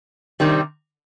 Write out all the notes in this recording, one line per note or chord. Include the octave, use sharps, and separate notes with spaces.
C3 D#3 G3 C4